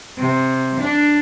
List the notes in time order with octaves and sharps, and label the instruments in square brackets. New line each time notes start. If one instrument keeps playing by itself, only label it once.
[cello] C3
D4